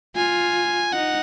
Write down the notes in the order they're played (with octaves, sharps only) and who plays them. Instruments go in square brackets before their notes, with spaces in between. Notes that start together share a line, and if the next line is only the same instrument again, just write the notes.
[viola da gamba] F4 [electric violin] G#5
[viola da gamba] D#4 [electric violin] F#5